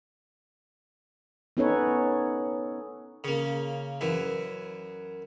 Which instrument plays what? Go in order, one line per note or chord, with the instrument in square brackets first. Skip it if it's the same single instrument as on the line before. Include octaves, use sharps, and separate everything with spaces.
[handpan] B3 C#4 D#4 A4 B4 C#5
[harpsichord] C#3 A#3
F#2 E3